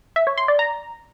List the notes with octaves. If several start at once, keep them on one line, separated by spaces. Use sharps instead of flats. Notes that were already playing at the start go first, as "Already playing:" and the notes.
E5
C#5
C6
D5
A#5